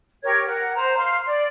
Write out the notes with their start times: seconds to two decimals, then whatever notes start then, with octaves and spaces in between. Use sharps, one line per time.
0.23 G4 A#4 C#5 G#6
0.46 A#4 F#5
0.75 C5 A#5
0.97 F5 C6
1.26 D5